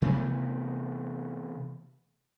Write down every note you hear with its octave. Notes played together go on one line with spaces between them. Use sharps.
C3 E3 A3 B3